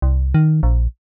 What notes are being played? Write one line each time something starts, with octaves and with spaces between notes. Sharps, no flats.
C2
D#3
A#1